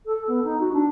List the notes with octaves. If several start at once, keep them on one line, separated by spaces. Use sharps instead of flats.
A4
B3
D#4
F#4
D4